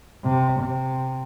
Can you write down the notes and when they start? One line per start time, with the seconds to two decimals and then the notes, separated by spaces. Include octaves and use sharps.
0.24 C3
0.59 C3